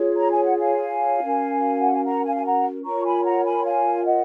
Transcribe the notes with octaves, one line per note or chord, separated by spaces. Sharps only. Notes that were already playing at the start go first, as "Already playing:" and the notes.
Already playing: F4 G#4 C#5
A#5
G#5
F#5
F5 G#5
C#4 F#4 A#4
F#5
G#5
F#5 A#5
F5 G#5
G#5
F#5 A#5
F4 A#4 C#5 A#5 C#6
G#5 B5
F#5 A#5
G#5 B5
F5 G#5
D#5 F#5